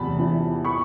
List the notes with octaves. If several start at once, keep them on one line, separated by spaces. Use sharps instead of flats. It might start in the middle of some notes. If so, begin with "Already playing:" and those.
Already playing: E2 C3 A5 B5
E3
B5 C#6